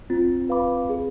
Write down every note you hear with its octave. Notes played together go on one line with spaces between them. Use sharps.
C4 F4
B4 F5 B5 D6
G#4